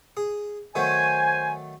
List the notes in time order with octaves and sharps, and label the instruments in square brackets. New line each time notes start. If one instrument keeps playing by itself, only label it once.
[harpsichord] G#4
[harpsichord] D#3 F#3 A3 [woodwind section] C5 G#5